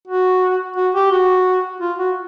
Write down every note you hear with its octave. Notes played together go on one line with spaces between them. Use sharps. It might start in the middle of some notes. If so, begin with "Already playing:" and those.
F#4
F#4
G4
F#4
F4
F#4